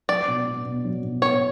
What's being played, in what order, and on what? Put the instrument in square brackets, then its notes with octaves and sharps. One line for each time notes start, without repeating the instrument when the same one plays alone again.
[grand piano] F#3 [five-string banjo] D5
[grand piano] B2
B3
B2
F#3
B2
[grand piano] B3 [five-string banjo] C#5